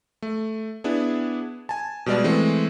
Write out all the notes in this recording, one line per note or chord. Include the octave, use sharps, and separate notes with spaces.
A3
B3 D4 E4 G#4
G#5 A5
B2 G3 G#3 D5
E3 G#3 A3 C4